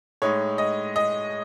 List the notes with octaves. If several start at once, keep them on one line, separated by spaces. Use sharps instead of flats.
A2 G#3 D#4 C#5
D#5
D#5